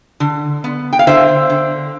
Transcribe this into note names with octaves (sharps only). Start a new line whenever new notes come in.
D3
B3
G5
F5
D3 C5 E5
D3